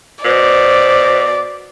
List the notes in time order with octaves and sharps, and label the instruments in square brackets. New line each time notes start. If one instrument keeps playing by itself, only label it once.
[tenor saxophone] B2 [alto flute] C5 [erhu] D5